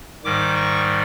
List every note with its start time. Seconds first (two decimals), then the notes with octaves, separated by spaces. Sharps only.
0.24 G#2 D#3 G3 D6
0.55 C#6